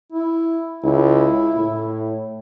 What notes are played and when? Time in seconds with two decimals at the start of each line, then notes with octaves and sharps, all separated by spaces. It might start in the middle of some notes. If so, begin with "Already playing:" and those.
0.12 E4
0.84 C#2 E4
1.56 A2